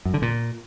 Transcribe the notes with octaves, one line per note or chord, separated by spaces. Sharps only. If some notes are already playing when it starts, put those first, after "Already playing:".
F#2
D3
A#2